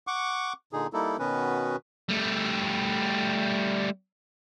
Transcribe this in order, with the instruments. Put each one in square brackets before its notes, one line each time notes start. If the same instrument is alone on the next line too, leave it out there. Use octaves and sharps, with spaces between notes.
[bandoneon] F#5 C#6 D6
A#2 D3 D#4 G#4
G3 A#3 D#4 E4 A4
B2 D#3 B3 C#4 F#4 B4
[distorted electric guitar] G3 A3